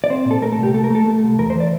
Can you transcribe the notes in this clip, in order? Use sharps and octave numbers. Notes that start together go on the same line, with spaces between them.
D5
C4 C5
A#2
A4
A3 A#4
A4
C2
G4
A3 A4
A#4
A3 A4
A3
C2
E2 A#4
C5
E3
D5